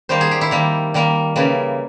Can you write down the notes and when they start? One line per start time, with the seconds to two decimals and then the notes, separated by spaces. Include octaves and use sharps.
0.09 D#3 G3 A#3 C5
0.21 G#4
0.31 G4
0.41 E4
0.51 D#3 G3 A#3
0.94 D#3 G3 A#3
1.36 C#3 E3 G3 A#3